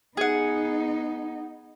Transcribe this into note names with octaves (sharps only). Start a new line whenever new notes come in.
B3 D#4 G#4 F#5